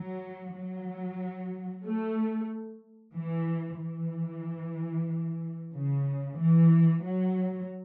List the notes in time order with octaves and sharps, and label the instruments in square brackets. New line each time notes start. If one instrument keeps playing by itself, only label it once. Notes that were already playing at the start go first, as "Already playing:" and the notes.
Already playing: [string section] F#3
F#3
A3
E3
E3
C#3
E3
F#3